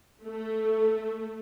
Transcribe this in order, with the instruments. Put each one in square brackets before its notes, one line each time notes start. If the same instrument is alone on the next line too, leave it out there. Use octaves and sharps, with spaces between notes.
[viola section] A3